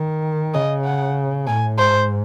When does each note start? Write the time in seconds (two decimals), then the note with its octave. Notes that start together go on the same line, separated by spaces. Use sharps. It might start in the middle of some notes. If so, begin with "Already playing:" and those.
Already playing: D#3
0.54 C#3 D#5
0.85 F#5
1.47 A2 G#5
1.78 G#2 C5